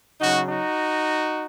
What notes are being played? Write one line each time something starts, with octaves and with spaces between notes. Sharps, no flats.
C#3 F#3 D#4 F#4
D#4 F#4